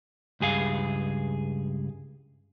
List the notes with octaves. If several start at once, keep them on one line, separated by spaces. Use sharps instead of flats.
C#2 G2 G#4 F5